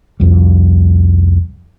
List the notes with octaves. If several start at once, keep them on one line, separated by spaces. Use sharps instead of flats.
C2 F2 G3